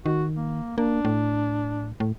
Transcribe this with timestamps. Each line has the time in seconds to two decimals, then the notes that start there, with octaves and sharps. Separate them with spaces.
0.06 D#3 F#4
0.36 A#3
0.78 A#3 D4
1.05 A2
2.00 A2